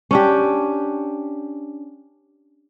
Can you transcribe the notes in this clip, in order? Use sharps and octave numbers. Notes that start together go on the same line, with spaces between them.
C#4 D4 G4